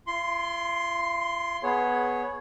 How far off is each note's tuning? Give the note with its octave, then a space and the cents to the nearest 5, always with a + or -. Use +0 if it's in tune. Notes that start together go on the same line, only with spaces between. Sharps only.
F4 -45 C6 +0
B3 +0 G#4 +20 C#5 -5